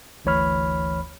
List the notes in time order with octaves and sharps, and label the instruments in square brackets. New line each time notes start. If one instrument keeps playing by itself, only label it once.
[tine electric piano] G1 D2 E3 C#5 B5 F6